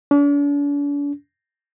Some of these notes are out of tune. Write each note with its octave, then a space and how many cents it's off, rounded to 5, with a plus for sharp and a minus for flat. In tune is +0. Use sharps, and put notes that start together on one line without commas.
D4 -45